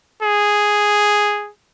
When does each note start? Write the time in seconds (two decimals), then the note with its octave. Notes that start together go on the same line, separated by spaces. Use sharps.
0.23 G#4